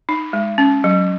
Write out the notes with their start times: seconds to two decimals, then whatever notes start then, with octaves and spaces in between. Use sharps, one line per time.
0.09 D#4
0.33 G#3
0.58 C#4
0.84 F#3